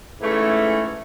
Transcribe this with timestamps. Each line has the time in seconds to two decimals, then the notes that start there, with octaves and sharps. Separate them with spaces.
0.19 G#2 E3 A3 C#4